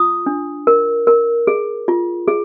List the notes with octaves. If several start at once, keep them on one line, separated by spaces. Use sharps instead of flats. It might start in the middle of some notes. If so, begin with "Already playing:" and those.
Already playing: F4 D#6
D4
A#4
A#4
G#4
F4
G#4